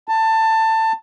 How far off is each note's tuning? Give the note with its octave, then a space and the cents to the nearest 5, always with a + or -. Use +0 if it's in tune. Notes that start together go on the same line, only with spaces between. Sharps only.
A5 +20